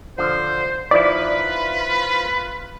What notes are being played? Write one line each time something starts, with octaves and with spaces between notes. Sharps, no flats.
D3 F3 C5
D#3 F3 E4 F4 B4 D5 B5